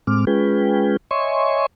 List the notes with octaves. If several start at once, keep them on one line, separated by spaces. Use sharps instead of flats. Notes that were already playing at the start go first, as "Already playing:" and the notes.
A2 G#3 C4 D6 F6
G#3 C#4 F4 G#4 B4 G5
C#5 D#5 E5 G#5 C6 C#6